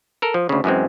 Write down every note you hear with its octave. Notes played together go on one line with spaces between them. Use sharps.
A4 A#4
F3
D2 C#3
F#2 E3 G#3 C4